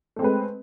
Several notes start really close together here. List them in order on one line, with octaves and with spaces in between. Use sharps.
A3 C4 G#3 B4